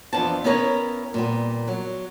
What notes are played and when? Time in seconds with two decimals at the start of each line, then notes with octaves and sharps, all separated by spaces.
0.13 F2 E3 B3 D4 C5 A5
0.44 B3 C#4 E4 A#4 B4 C#5
1.14 A#2 G3 B3
1.68 F#3